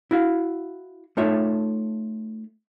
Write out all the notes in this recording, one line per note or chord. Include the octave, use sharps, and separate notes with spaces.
E4 F#4 F5
A3 D#4 F4 A4 C#5 E5